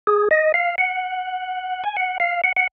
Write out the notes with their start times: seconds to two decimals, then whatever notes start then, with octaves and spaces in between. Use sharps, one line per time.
0.07 G#4
0.31 D#5
0.54 F5
0.78 F#5
1.84 G#5
1.96 F#5
2.20 F5
2.44 F#5
2.56 F#5